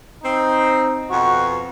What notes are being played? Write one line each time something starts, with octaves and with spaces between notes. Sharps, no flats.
C4 D#4
F2 B2 F#4